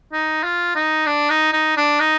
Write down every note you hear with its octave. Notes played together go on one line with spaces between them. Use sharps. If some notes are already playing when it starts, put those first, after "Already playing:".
D#4
F4
D#4
D4
D#4
D#4
D4
D#4